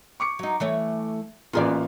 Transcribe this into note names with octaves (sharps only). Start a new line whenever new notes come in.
C#6 D6 C#7
F#3 D#4
E3 A3 C#5
A1 A#3 B3 F4 G#4 D5